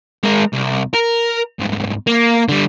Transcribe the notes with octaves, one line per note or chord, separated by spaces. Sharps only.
G#3 A#4
C2
A#4
C2 G#2
A#3
D3 G3